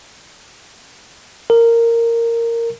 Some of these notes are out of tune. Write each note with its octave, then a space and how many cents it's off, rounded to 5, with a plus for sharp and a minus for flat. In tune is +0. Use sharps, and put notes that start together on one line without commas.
A#4 -10